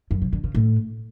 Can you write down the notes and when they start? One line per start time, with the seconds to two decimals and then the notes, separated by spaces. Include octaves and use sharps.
0.11 F#2
0.22 C3
0.33 D3
0.44 C#3
0.55 A2